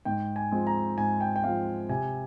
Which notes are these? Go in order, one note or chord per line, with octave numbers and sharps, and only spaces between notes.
G#2 G5
G#5
F3 G#3 C4
A#5
G#2 G#5
G5
G5
F3 G#3 C4 F5
C3 G#5